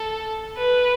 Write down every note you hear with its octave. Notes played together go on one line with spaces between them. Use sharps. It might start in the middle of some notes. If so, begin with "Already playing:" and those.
Already playing: A4
B4